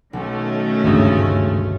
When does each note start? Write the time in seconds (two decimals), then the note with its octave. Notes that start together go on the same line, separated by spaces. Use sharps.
0.13 B1 D#3 A3 C#4
0.84 G#1 D2 G2 C#3 E5 D#6